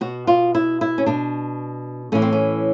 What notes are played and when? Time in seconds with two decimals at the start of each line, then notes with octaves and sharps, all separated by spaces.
0.01 B2 F#4
0.27 F4
0.55 E4
0.81 E4
0.98 C#4
1.06 B2 D4
2.12 A2 E3 C#4
2.22 C4
2.32 C#4